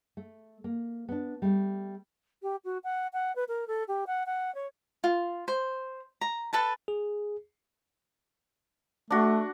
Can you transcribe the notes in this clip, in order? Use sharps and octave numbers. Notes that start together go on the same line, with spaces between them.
A3
A#3
B3 D4
G3 A3
G4
F#4
F#5
F#5
B4
A#4
A4
G4
F#5
F#5
C#5
F4
C5
A#5
A4 B4 A5
G#4
A3 D4 F#4